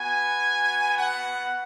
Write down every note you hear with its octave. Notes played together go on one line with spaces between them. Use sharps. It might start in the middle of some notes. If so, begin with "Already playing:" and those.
Already playing: B3 F#4 G#5
F#5